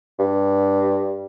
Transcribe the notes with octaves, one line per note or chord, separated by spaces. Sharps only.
G2